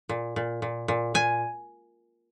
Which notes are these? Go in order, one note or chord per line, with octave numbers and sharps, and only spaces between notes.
A#2
A#2
A#2
A#2
A#2 G#5